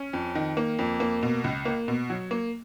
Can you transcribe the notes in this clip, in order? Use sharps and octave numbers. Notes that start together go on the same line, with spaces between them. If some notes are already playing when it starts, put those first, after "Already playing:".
Already playing: C#4
F2
D#3
A#3
F2
A#3
B2
C#2
A#3
B2
F#3
A#3